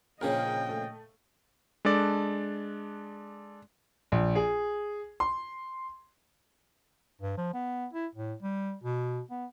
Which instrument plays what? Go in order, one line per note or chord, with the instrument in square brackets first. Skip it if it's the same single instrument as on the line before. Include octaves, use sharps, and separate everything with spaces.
[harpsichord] A#1 C#3 F3 [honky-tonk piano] C#4 G#4 A#4 [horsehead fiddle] D#5 G5
[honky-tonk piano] A3
[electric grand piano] G#3 D4 A4 D5
[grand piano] A#1
G#4
C6
[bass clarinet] G2
F3
B3
E4
A2
G3
B2
B3